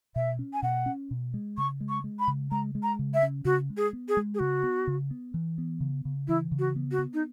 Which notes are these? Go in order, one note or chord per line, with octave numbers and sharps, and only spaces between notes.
B2 E5
C#4
G#5
B2 F#5
C#4
B2
G#3
C#3 C#6
G#3
C#6
G#3
B5
C#3
G#3 A#5
G#3
A#5
C#3
E5
C#4
C#3 F#4
G#3
G#4
B3
G#4
G#3
G#4
C#3 F#4
B3
C#3
B3
E3
B3
C#3
C#3
E3 E4
C#3
F#4
B3
F#4
B3
D#4